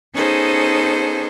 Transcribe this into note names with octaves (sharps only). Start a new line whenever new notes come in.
B3 C#4 D#4 G#4 A4 C5